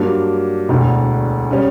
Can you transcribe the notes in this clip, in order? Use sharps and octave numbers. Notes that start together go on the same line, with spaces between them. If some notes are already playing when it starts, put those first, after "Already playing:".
Already playing: G2 F#3 A#3 D4
E1 D2 D3
C#3 G3 C#4